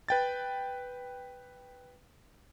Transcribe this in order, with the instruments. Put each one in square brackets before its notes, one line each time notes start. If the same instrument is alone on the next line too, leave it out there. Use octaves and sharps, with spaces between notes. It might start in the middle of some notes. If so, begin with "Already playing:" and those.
[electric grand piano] B4 G5 A6